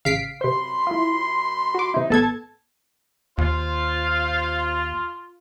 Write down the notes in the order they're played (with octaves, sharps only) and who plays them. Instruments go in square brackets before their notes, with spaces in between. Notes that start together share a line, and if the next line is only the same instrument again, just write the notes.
[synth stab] A1 C#3 D7 [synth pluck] F5 B6 C7
[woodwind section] F#2 B5 C6 [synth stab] C3 C5
[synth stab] E4 F4
F#4 D6
[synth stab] C3 E4 [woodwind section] D#4
[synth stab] A1 [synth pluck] B3 A4 G#6 [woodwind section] A5
[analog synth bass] D#2 [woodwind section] F4 [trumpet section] C5 F5